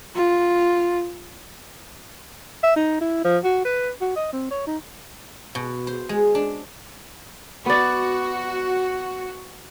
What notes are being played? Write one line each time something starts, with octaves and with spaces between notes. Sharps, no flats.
F4
E5
D#4
E4
F3
F#4
B4
F#4
D#5
C4
C#5
D#4
B2
C5
G#3
D4
B3 F#4 D5